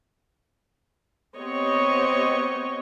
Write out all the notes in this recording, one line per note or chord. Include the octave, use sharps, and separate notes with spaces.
B3 C4 G4 C#5 D#5